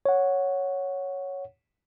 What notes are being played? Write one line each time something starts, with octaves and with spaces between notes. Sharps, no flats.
C#5 F#5